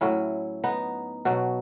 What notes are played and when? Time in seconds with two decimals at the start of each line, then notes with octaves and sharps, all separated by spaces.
0.01 A2 F#3 C#4 E4
0.64 B3 D#4
1.25 B2 F#3